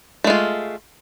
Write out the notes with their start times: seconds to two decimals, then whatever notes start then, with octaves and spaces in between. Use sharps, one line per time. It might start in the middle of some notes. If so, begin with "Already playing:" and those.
0.24 A3
0.27 G#3
0.30 F4